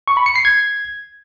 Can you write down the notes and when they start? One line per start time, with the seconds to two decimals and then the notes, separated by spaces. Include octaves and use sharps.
0.08 C#6
0.17 B5
0.26 C#7
0.36 C7
0.45 G#6